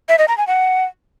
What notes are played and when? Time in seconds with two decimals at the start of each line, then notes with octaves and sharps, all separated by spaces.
0.09 E5
0.18 D#5
0.28 A#5
0.38 G#5
0.47 F#5